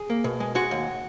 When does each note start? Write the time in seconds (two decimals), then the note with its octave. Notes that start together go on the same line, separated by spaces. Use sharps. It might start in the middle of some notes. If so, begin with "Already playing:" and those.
Already playing: G#4
0.10 A#3
0.24 B2
0.40 G#3
0.55 G#3 F#4
0.71 D#2